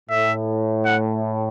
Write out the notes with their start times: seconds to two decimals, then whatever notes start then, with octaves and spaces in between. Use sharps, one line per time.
0.10 A2 E5
0.85 F#5